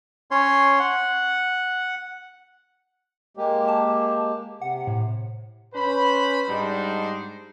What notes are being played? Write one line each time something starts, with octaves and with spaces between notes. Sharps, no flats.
C#4 C#5 C6
F#5
G#3 A#3 G4
A5
C3 F#5
A2
C#4 B4 C5 B5
G#2 G3 D4 D#4 C5